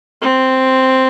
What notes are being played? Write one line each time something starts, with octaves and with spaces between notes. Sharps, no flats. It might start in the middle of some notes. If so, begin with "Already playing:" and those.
C4